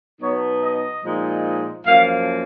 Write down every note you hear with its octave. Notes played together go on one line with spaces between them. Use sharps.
B2 F#3 B3 D#4 C#5
D#5
A#2 F3 G#3 D#4
F#2 F3 A#3 F5